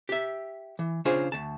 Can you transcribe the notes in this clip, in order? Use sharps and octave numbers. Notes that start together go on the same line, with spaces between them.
G4 E5
E3
C#3 D4 F4 G#4 C5 C#5
D2 A5